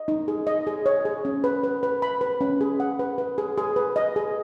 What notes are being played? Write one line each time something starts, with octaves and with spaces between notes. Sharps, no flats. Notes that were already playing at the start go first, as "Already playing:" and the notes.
Already playing: D#5
D#4
G#4
D#5
G#4
C#5
G#4
C#4
B4
B4
B4
B5
B4
C#4
G#4
F#5
B4
B4
G#4
G#4
B4
D#5
G#4